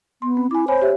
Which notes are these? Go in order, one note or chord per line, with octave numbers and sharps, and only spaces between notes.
B3 C6
C4
E4 G#5 D6
C5 C#5 G#5 B5
G4 C#5 E5